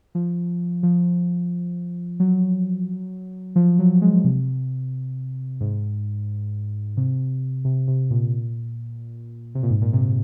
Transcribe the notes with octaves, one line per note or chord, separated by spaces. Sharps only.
F3
F3
F#3
F3
F#3
G#3
C3
G#2
C3
C3
C3
A#2
C3
A#2
G#2
A#2
C3